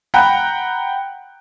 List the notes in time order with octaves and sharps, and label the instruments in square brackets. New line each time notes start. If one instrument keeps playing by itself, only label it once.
[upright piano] F#5 G5 A#5 B5 F#6